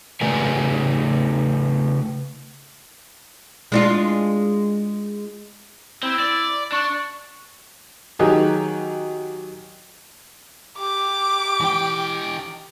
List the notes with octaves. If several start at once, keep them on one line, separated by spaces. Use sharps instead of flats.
C#3 A3 A#4 B4 D5 G#5
G#3 D4 F4
C4 E4
D5
D4 C#6
D#3 F#3 D#4 G4 G#4
G4 D6
E3 G5